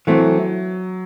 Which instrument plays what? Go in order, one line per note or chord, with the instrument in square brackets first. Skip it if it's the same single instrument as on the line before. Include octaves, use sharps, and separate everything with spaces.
[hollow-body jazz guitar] E3 A3 C4 [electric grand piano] F#3